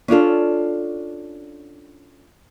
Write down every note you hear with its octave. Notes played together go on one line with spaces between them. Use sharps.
C#4 D4 F4 A4